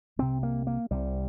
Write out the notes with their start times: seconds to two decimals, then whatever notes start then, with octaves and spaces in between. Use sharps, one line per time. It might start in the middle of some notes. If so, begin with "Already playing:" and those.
0.19 C2 C3 C4
0.43 A#3
0.67 A#3
0.91 C2 C3 G3